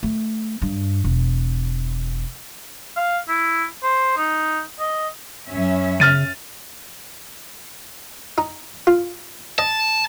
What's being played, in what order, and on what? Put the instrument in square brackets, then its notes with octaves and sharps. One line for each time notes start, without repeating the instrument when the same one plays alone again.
[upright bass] A3
G2
E1
[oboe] F5
E4
C5
D#4
D#5
[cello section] F#2 C#4 E5
[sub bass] C#3 [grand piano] F6 A6 D#7
[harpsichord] D#4
F4
[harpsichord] D#5 [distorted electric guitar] A5